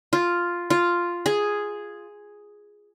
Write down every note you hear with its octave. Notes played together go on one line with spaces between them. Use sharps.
F4
F4
G#4